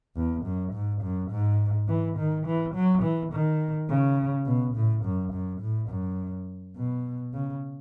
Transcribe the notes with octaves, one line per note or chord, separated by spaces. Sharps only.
E2
F#2
G#2
F#2
G#2
E3
D#3
E3
F#3
E3
D#3
C#3
B2
A2
F#2
F#2
A2
F#2
B2
C#3